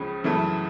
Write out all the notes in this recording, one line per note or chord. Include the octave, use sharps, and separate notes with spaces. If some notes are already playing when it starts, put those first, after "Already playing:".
Already playing: C#2 C#3 F3 G#3 C#4
F#2 C#3 E3 A3